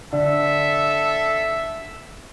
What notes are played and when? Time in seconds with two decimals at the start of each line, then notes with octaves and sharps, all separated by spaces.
0.13 D3 A4 E5